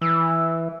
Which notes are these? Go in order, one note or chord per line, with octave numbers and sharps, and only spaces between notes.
E3 E6